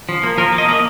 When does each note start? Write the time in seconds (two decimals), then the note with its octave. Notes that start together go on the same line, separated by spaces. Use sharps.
0.09 F3
0.23 A#3
0.38 F3 A#4
0.53 A#3
0.58 D#5
0.68 A#3 D#5